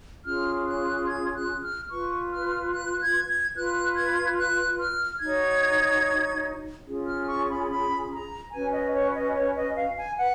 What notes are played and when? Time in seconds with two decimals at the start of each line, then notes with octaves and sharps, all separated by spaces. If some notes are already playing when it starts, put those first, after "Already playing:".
0.25 C#4 F4 G#4 F6
0.66 F#6
1.08 G#6
1.35 F#6
1.63 F6
1.90 F4 B4 C#6
2.31 F6
2.73 F#6
3.01 G#6
3.28 G#6
3.56 F4 B4 F#6
3.97 G#6
4.38 F#6
4.80 F6
5.21 D#4 F#4 C#5 G#6
6.86 C#4 F4 G#4
7.08 F6
7.28 C#6
7.49 B5
7.70 B5
8.11 A#5
8.52 C#4 F#4 B4 G#5
8.73 D#5
8.94 C#5
9.15 D#5
9.36 C#5
9.56 D#5
9.76 F5
9.98 G#5
10.18 B4 F#5